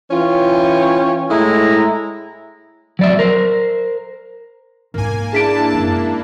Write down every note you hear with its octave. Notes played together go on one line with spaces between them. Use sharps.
E3 C#4 F4 G5
A2 G#3 E4 A#5
F#3 D5 E5
A#4 C5
G#2 A#3 D#4 G#5
A#3 D4 E4 G#4 A5 B6 D7
F#2 G#3